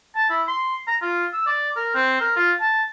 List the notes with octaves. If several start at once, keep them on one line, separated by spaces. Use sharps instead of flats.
A5
E4
C6
A#5
F4
E6
D5
A#4
C4
A#4
F4
A5